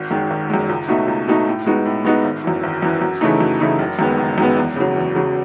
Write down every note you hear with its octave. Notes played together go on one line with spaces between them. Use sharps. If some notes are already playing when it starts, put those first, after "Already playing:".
Already playing: G#1
F#2 D#3 G#3
G#1
F#2 D#3 G#3
C#2
B2 A3 D#4 F#4
C#2
B2 A3 D#4 F#4
A2
G#3 B3 D#4 F#4
A2
G#3 B3 D#4 F#4
G#1
F#2 E3
G#1
F#2 E3
F#2
C#3 E3 A3 D#4
F#2
C#3 E3 A3 D#4
F#1
F#2 D#3 G#3 B3
F#1
F#2 D#3 G#3 B3
E2
C#3 F#3
E2
C#3 F#3